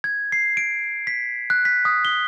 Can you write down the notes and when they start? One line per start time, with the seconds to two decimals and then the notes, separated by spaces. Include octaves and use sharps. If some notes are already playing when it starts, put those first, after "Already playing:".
0.04 G#6
0.32 C7
0.57 D7
1.07 B6
1.50 F#6
1.65 B6
1.85 D#6
2.05 G7